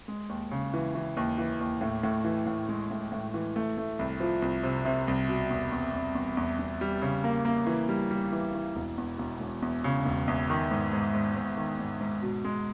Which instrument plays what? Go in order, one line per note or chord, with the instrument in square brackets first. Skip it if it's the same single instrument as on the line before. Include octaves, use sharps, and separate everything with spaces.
[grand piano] G#3
D#2
C#3
E3
E3
D#2
E3
D#2
A2
A2
E3
A2
G#3
A2
A2
E3
A3
A3
C2
F3
C2
C3
C3
C2
B2
E2
E2
E2
E2
E2
E2
G3
C#3
A#3
A#3
E3
G3
G3
E3
E3
E1
E2
E1
E1
E2
C#3
E1
E2
D#3
G#2
G#2
G#2
G#2
D#3
G#2
G#2
B2
G#3